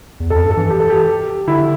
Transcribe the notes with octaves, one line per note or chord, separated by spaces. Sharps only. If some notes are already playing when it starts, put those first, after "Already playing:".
E2
F2 A4
G2
A4
E3
G4
A4
G4
D3 E4